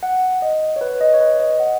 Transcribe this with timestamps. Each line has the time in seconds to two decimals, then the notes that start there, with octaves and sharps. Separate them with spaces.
0.03 F#5
0.42 D#5
0.76 C#5
0.81 B4
1.01 D#5
1.14 C#5
1.21 B4
1.40 D#5
1.60 F#5